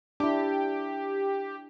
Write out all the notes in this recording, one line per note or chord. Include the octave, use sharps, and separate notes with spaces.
D4 E4 G4